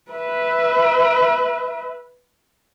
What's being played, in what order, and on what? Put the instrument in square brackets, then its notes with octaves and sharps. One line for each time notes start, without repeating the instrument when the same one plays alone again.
[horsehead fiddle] B4 E5